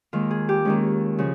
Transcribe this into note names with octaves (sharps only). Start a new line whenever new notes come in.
D#2 D#3 G#3 F4
G#4
G4
D#2 D#3 G#3 C#4
C#3 F3